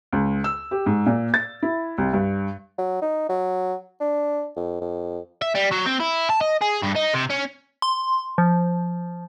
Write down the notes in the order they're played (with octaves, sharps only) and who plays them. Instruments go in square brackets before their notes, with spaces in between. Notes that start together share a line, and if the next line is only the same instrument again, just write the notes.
[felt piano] C#2
E6
G4
G#2
A#2
A6
E4
C2
G2
[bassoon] F#3
D#4
F#3
D4
F2
F2
[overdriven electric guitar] E5
G3
F#3
C4
E4
A5
D#5
G#4
G2
D#4
C3
C#4
[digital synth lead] C6
F3